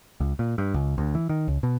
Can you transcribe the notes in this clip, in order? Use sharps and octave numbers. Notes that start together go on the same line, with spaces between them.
C#2
A#2
G2
C#2
D2
E3
D#3
C#2
B2